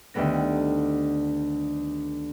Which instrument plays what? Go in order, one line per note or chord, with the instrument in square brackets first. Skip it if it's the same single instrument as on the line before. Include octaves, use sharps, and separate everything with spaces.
[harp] D2 D#3 G3 A3 B3 A#6